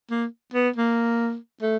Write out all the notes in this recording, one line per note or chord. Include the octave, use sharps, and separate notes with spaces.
A#3
B3
A#3
A3